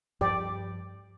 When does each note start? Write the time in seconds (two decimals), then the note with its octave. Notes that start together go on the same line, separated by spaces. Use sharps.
0.21 G2 F3 G4 D5